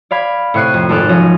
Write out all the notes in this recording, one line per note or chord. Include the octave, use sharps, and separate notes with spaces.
D5 F5 B5 G#6
A2 C3 C#6 F#6 C7 D#7
F2
G#1 A4 D6 F6 F#6
B1 F3 C#4 A#6 D#7